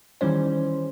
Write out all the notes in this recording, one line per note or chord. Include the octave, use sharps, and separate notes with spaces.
D#3 E3 G3 C#4 C5